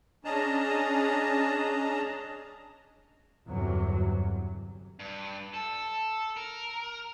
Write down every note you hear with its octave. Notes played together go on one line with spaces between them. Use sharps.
C#4 D4 G#4 D#5 A5 A#5
G1 E2 C3 F#3
G2
A4
A#4